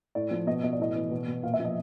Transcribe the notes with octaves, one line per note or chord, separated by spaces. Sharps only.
A2 D5
F3
B2 D#5
B2 D#5
D5
A2 D#5
E3
B2
B2
A#2 F5
E5
F3
D#5